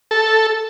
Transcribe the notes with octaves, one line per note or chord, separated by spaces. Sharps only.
A4